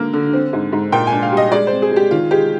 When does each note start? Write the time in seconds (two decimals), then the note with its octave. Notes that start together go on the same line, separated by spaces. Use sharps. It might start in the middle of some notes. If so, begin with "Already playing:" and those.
Already playing: D3 A#3
0.13 D3
0.33 C4
0.53 G#2
0.73 G#2
0.92 A#2 G5
1.07 G#5
1.12 D4
1.23 F5
1.32 G3
1.37 D#5
1.52 G#3 D5
1.67 C4 C5
1.82 G#4
1.92 G#3 G4
2.11 D#3 F4
2.31 G#3 G4